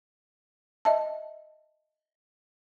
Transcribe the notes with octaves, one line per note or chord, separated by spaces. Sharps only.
D#5 E5 A5